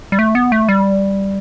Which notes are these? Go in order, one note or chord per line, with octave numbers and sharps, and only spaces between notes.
G3
A3
B3
A3
G3